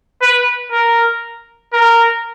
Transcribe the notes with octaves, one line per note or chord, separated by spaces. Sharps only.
B4
A#4
A#4